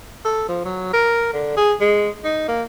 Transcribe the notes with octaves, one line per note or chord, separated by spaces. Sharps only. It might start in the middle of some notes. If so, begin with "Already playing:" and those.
A4
F3
F#3
A#4
D3
G#4
G#3
D#4
A#3